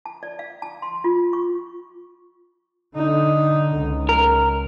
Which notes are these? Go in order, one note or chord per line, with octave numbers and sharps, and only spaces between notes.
A5
D5
F5
A5
C6
F4
C#6
D3 D#4
C#2
A#4